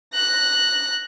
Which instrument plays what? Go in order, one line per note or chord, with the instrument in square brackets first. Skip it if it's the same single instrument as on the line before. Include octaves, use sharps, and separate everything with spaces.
[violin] F#6 A#6